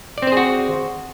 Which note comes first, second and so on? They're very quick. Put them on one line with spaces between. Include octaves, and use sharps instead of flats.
D5 C4 C5 G#4 F#4